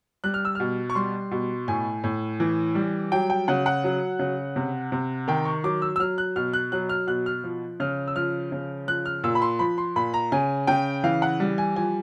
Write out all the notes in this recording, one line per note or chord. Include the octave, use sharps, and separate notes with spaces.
G3 F#6
F6
E6
B2 F6
C#6
G3 C6
B2
A2 G#5
A2
E3
G3
F#3 G5
G5
C#3 F#5
F#5
F#3
C#3
C3
C3
D#3 G5
C#6
F#3 D6
E6
E6
F#3 F6
F#6
B2 F6
F#6
F#3 F#6
F6
B2 F#6
F6
F3
C#3 F6
E6
F3 F6
C#3
F3 F#6
F6
A#2 E6
B5
C6
F3 B5
C6
A#2 B5
A#5
C#3 G#5
C#3 G5
E3 F5
F#5
G3
G#5
F3 G#5